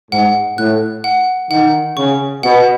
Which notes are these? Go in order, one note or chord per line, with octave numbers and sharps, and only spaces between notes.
G#2 F#5
A2 F#6
F#5
D#3 F#5
C#3 C#6
B2 F#5